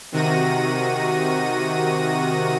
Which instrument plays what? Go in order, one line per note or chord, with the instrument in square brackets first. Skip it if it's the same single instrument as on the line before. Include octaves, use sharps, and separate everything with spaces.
[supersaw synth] C3 D#3 F#4 A#6 D#7